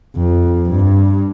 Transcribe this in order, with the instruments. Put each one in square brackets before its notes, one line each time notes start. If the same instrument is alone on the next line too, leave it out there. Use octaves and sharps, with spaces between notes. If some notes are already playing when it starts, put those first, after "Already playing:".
[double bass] F2
G2